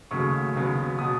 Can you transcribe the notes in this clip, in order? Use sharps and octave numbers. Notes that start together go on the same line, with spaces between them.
D#2 C#3 F#3 A3 C#6
D#2 C#3 F#3 B3
B2 F#3 D#6